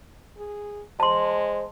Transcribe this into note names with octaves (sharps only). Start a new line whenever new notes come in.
G#4
G#3 C5 A5 C6